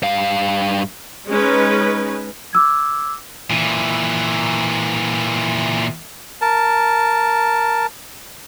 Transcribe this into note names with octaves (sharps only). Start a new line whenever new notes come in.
G2 F5
G#3 C#4 D#4 B4
D6 E6 G#6
A#2 E3
A#4 A5